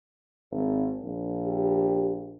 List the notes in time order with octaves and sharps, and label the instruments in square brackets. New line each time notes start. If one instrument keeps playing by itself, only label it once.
[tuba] G#1
A#1
[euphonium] G4